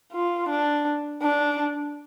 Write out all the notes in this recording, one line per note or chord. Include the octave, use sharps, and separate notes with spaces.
F4
D4
D4